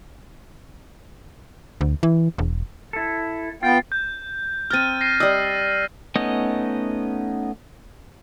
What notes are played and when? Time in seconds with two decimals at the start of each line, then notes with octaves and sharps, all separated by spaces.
1.81 D2
2.03 E3
2.38 E1
2.93 E4 A4
3.63 B3 F4 G5
3.92 G6
4.70 C4 A#5 F6 A6 D#7
5.01 A#6 C7 D#7
5.20 G3 D#5 E6
6.16 A3 B3 C#4 D#4 D#5